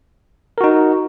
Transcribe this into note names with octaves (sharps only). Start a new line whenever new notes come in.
D#4 F#4 A#4